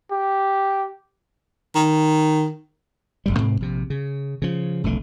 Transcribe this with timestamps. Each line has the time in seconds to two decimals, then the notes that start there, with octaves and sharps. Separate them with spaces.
0.11 G4
1.75 D#3
3.26 E1 B1 G3
3.38 G#2 C3 C4
3.61 A#1 C3
3.90 C#3
4.42 C#3 F3
4.84 F1 B1 D3 A3